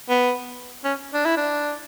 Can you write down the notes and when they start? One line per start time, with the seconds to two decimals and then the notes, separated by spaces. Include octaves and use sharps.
0.09 B3
0.84 C#4
1.13 D4
1.25 E4
1.37 D4